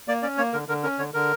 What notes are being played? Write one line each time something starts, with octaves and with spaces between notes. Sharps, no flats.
A#3 D5
C#4 D5
A#3 C#5
D3 A#4
D3 A#4
C#4 A#4
D3 C#5
D3 A#4